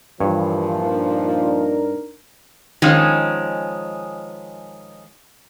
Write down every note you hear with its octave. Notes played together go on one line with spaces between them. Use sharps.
G2 A#2 E3 F3 C#5
D4 D#4 A#4
D#3 F3 G#3 C#4